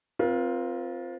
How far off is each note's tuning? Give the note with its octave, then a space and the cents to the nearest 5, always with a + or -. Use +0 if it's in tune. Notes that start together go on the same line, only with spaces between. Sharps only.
C4 +0 F4 +0 A#4 +45